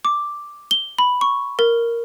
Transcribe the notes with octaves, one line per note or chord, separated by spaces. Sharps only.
D6
G7
B5
C#6
A#4